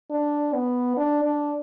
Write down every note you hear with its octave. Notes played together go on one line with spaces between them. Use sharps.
D4
B3
D4
D4